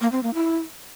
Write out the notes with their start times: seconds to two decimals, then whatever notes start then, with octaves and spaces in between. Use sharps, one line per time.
0.01 A#3
0.12 C4
0.23 A#3
0.34 E4